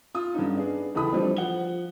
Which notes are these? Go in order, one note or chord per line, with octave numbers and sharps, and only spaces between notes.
F4 D#6
G2 D3 C#4 D#4
B3 D4 G#4
D1 C#2 E3 A4 B5 D#6
E3 F3 G3 A3 C4 D4
F3 F#5 G7